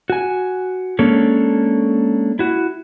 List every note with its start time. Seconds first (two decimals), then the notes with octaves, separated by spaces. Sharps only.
0.10 F#4 G#5
0.99 G#3 A#3 C#4 D4 A4 C#5
2.39 E4 F#4